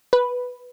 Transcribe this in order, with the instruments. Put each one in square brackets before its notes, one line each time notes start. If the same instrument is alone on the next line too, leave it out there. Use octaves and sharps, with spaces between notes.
[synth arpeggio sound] B4